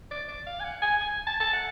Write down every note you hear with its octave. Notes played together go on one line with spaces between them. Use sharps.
D5
D5
F5
G#5
F#5
G#5
G#5
A5
A5
F#5